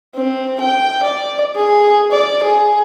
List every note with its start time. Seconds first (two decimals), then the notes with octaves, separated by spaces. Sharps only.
0.15 C4
0.60 G5
1.03 D5
1.55 G#4
2.11 D5
2.43 G#4